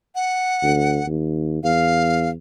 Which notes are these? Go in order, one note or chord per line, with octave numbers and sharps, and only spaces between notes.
F#5
D2
D#2
E2 F5